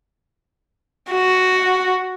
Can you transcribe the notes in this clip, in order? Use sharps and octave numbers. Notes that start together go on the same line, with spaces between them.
F#4